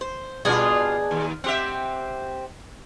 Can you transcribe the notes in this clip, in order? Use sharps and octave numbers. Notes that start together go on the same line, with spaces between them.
C5
B2 G3 D4 F4 G#4
D#2
C4 G4 E5 F#5